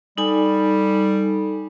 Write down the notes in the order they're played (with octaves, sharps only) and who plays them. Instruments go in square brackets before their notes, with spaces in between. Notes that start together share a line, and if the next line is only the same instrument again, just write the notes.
[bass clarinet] G3 [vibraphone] D#4 A4 G#5